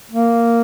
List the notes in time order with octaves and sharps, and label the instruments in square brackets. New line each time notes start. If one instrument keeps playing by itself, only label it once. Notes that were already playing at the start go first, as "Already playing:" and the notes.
[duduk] A#3